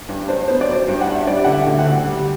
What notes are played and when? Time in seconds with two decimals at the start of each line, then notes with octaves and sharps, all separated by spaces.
0.09 G2
0.28 D4 C5
0.48 B3 C5
0.61 D5
0.68 F#3
0.75 C5
0.88 G2
1.01 F#5
1.07 D4
1.15 E5
1.27 G3 D5
1.44 D3 F#5
1.53 E5
1.67 D2
1.79 F#5
1.86 D2
2.05 G3